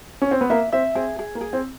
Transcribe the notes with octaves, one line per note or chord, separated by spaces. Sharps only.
C#4
C4
B3
A#3 E5
C4 E5
C4 G#4
G#4
A#3
G#4
C4